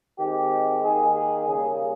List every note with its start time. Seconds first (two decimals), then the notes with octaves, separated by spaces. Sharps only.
0.19 D#3 G#3 C4 G4
0.83 D#3 A#3 G#4
1.15 G#4
1.48 C#3 G3 A#3 G#4